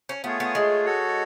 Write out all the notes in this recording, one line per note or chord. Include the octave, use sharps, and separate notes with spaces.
C#4
A3 B3 F4 G#4 C#5
B3
G#3
F#4 A4 C#5